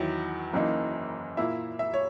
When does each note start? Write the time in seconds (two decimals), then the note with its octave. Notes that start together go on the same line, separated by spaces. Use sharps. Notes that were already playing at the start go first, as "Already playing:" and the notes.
Already playing: E2 D#3 F#3 E4
0.53 F#1 F#2 E3 A#3 D#4
1.37 A#2 A#3 E4 E5
1.79 E5
1.94 C#5